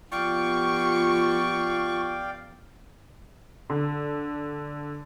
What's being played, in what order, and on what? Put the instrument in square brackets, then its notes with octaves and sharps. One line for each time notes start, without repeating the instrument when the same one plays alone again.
[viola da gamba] F3 B3 G4 [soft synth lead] F4 [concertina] D5 F5 G5 [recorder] C#6
[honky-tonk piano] D3